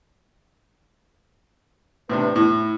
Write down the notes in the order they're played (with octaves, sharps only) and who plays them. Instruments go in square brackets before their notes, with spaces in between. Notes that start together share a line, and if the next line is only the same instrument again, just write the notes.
[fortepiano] A2 C3 D4 [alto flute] B4
[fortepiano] A2 [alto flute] E4